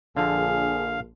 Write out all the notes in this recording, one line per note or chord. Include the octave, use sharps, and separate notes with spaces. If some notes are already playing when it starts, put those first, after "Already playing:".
A#1 D3 F3 G#4 F5